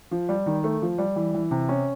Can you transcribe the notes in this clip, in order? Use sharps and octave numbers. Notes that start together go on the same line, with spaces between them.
F3
G3
D#3
A3
F3
G3
E3
E3
C3
C#4